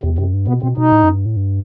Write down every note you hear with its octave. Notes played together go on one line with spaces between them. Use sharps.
E2 C3
F#2 C3
G2
B2 B3
B2 C4
B2 D#4
A2
F#2
G2
A2
G2